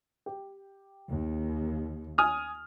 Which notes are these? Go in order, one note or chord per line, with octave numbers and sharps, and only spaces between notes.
G4
D#2
G#5 D#6 F6